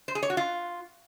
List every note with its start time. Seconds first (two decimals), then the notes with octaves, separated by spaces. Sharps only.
0.08 C5
0.15 G#4
0.23 C#5
0.30 F#4
0.37 F4